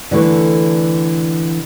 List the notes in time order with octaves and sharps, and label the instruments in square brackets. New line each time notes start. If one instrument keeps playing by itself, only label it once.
[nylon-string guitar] D3 E3 A3